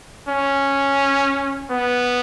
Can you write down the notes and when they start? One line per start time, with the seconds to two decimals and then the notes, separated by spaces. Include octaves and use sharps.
0.29 C#4
1.71 B3